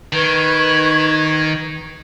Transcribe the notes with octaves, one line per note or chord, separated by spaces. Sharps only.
D#3 B4 C#6 G#6